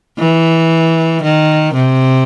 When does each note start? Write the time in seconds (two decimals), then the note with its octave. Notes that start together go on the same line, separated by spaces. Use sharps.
0.18 E3
1.23 D#3
1.74 C3